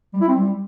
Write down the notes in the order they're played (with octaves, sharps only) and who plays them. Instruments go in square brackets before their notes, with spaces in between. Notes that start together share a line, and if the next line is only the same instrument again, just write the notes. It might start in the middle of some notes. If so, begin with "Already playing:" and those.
[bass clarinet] G3
E4
C4
G3